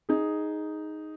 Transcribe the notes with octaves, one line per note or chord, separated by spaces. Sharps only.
D#4 G#4